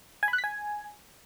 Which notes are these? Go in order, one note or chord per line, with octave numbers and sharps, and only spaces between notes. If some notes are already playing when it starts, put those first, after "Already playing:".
G#5
B5
F#6
B6
G#5